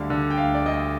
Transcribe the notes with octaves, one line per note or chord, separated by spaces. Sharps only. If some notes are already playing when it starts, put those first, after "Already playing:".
Already playing: D2 D3 G3 F5
D3
G5
D2 F5
D5
D2 D#5